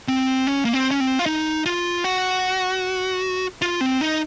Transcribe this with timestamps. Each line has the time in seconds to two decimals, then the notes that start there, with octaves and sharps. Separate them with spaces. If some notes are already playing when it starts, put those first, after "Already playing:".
0.08 C4
0.47 C#4
0.65 A#3
0.73 C4
0.91 C#4
1.00 C4
1.19 F4
1.26 D#4
1.66 F4
2.04 F#4
3.62 F4
3.81 C4
4.01 D#4